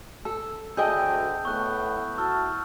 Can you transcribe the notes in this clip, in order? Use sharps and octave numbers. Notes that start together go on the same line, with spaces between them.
A4 E6
D2 G#4 D#5 G5 A5 D#6 G6
A2 A3 B3 C#6 F#6
E4 F#4 A5 C#6 E6 F6